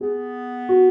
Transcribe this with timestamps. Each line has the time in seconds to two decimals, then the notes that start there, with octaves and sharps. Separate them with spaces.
0.01 B3 G#4
0.69 F#4